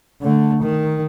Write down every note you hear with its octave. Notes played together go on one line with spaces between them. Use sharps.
D3 A3
D#3